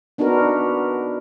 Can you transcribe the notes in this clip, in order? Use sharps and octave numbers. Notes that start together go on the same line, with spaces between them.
B3 D4 D#4 F#4 A#4 B4